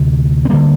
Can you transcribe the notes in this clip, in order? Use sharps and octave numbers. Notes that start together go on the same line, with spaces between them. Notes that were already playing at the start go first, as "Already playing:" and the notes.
Already playing: D2 C3
C4
D2 D3 G3 A#3